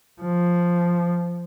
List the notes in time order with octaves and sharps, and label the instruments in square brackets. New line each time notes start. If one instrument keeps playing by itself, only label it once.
[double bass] F3